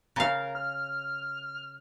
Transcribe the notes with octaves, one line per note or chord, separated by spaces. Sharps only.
C#3 A#4 F5
F6